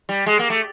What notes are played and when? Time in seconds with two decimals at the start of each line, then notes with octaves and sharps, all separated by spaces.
0.09 G3
0.26 G#3
0.39 A#3
0.50 A3